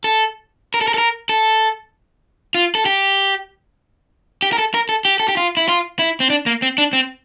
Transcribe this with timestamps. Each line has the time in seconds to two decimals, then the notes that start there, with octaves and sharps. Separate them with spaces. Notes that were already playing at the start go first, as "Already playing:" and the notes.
0.04 A4
0.74 A#4
0.81 A4
0.88 A#4
0.94 A4
0.98 A#4
1.29 A4
2.55 F4
2.75 A4
2.86 G4
4.42 G4
4.53 A#4
4.58 A4
4.74 A#4
4.89 A4
5.05 G4
5.20 A4
5.28 G4
5.37 F4
5.57 E4
5.68 F4
5.99 E4
6.20 C4
6.30 D4
6.46 A#3
6.62 C4
6.78 D4
6.93 C4